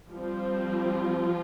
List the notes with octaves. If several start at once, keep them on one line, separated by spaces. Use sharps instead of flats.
F3 G3 C4 F4